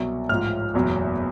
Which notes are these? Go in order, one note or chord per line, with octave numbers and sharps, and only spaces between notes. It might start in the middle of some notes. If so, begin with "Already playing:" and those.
Already playing: C2 B2 F#3
A1 G#2 F3 F6
F#1 E2 B2 F#3